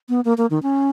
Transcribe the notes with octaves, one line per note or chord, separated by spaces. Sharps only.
B3
A#3
A#3
D#3
C#4